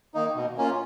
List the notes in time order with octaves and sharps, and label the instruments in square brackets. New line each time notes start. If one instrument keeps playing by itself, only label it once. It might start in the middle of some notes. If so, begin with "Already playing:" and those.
[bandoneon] D#3 A#3 D#4
B2
A#3 C#4 F4